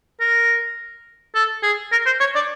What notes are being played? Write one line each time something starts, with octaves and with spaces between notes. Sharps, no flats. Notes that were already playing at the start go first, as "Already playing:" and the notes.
A#4
A4
G#4
A#4
C5
C#5
D5